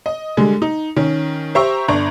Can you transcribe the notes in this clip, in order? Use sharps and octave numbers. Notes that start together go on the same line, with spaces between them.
D#5
D3 G3 G#3
D#4
D#3 C#4
G4 C5 E5 G5 A#5 C#6
G1 D4 A#5 C#6